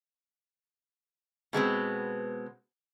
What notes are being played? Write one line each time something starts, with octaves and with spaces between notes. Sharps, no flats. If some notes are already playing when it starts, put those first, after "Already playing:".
B2 G#3 B3 C4